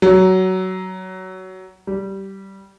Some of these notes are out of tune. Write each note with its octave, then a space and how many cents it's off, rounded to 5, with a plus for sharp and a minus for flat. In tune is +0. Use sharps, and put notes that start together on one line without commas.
F#3 +15
G3 -15